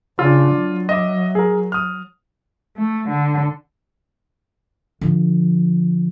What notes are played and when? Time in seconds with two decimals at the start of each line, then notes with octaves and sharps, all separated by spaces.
0.19 C#3 D4 F4
0.54 F#3
0.89 D#5 E5 D6
1.35 G#4 A#4
1.72 D#6 F6
2.77 A3
3.09 D3
5.01 D3 F3